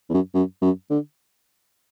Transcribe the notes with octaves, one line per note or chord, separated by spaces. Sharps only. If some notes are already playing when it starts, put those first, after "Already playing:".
E2
F#2
F#2
F#2
D3